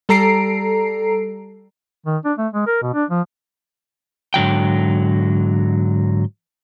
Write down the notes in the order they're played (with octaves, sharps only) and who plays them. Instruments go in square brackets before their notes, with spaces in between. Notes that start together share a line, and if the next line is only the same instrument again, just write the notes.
[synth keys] G3 A4 A#5 C7 D7
[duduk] D#3
D4
A3
G#3
A#4
B2
D4
F3
[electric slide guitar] G#2 D3 F#3 G5